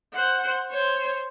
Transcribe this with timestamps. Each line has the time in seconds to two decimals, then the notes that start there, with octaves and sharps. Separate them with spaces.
0.13 C5 F#5
0.70 C5 C#5